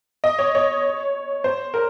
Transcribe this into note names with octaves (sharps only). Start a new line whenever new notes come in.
D#5
C#5
C#5
C5
A#4